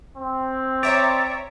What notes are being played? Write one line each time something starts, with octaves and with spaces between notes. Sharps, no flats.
C4
C#5 D5 E5 A#5